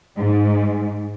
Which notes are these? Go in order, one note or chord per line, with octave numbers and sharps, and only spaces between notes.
G#2